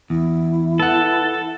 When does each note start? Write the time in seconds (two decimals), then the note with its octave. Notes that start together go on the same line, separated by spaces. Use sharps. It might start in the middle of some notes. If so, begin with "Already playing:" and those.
0.10 E2 E4
0.80 A4 B4 F#5